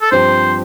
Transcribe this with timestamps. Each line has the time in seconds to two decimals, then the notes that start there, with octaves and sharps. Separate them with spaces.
0.02 A4
0.12 G2 F3 C4 G4 C5